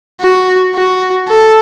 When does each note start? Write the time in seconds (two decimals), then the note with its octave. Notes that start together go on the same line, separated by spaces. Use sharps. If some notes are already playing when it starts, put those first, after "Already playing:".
0.21 F#4
0.75 F#4
1.28 A4